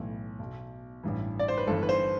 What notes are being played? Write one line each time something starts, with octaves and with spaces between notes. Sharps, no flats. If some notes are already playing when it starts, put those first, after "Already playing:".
Already playing: B1 A2 E3
B1 B2
A1 G2 E3
D5
C5
B4
G1 G2 E3 A4
B4
C5